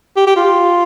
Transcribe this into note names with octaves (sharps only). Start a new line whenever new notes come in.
G4
G4
F4